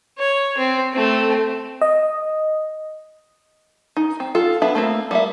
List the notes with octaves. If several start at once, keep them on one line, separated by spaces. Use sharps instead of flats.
C#5
C4
A3 C4
D#5
D#4
C4
F4 A4
B3 D4 E5 B5
A3 A#3 C4
G3 A#3 E5